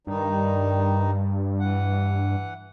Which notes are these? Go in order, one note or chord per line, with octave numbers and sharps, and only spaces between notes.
G2 D#3 G3 D#4
E3 F#5